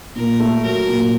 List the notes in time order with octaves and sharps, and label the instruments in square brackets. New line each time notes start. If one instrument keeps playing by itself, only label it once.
[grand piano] A#2 [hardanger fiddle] A#4
[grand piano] A3
[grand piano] F#3 [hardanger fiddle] A#4
[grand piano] A#2